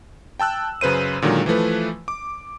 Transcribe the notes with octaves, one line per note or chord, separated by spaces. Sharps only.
G5 A5 E6 F#6
F#2 C#3 B4 C5 D#7
A#2 D3 D#3 F#3 G#3
E3 F3 A3 B4
D6